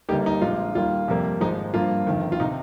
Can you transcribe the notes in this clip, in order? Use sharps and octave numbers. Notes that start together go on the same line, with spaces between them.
G1 G2 G3 A#3 D#4 G4
D#4
A#1 A#2 G#3 F4
D#2 D#3 G3 A#3 F4
F2 C3 G3 A#3
G#1 G#2 F3 G#3 D#4
G2 F3 A#3 F4
G1 F2 D#3
F4
C3 D#4